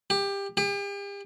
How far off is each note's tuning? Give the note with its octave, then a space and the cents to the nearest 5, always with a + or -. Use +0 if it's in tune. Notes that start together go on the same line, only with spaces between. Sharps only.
G4 +20
G4 +40